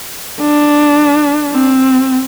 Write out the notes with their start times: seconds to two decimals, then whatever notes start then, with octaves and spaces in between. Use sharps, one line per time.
0.41 D4
1.52 C4